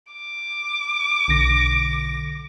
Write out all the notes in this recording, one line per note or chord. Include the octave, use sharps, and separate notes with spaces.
D6
B1 D3 A#6